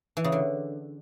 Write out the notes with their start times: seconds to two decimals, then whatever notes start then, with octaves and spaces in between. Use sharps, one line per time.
0.17 E3
0.24 C#3
0.32 D3